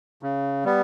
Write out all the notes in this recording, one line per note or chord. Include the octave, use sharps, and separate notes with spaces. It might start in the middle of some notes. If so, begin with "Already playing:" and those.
C#3
G3 B3